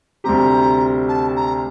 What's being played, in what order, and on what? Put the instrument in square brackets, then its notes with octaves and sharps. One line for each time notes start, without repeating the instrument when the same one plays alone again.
[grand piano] D2 C3 G3 C4 G4 [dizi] A#5
[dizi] A5
A#5